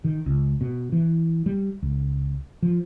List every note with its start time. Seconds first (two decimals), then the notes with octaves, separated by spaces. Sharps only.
0.04 D#3
0.26 C#2
0.61 B2
0.92 E3
1.46 G3
1.83 C#2
2.63 F3